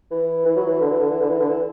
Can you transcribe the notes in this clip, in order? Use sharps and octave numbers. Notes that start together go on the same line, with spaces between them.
E3
E3
F#3
E3
D3
E3
D3
E3
D3
E3
D3
E3